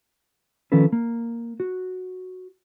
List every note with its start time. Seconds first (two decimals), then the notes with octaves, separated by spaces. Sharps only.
0.72 D#3 F3 C#4 A4 B4
0.92 A#3
1.60 F#4